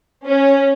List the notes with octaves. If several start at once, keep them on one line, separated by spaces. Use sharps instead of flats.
C#4